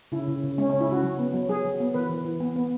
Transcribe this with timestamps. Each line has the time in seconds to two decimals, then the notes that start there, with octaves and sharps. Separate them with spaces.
0.12 C#3 E4
0.28 C#3
0.43 C#3
0.58 G#3 C#4
0.70 C#3 C#4
0.81 E4
0.89 C#3 F#4
1.03 F#3
1.19 B3
1.34 F#3
1.49 F#3 G#4
1.65 F#3
1.80 B3
1.94 E3 B4
2.10 E3
2.25 E3
2.40 B3
2.56 B3